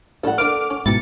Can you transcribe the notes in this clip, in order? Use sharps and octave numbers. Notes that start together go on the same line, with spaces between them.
A1 C#3 G3 A4 F#5
D3 A#3 C5 D6 F6
C#4
G#2 B2 E4 G5 A#5 A6 C#7